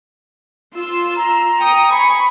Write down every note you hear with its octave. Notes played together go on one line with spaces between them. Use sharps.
F4 C6 E6
A#5
G5 D#6 C#7
G#5 B5 C#6